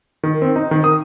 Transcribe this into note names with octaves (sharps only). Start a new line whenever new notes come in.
D#3
C4
D#4
D#3
D#6